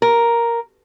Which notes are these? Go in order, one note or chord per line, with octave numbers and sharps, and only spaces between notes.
A#4